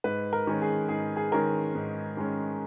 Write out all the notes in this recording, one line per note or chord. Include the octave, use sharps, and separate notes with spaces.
G#2 B4
A#4
D#3 G#3 C#4
G#4
G#2 G#4
G#4
D#3 G#3 C#4 A#4
G#2
D#3 G#3 C#4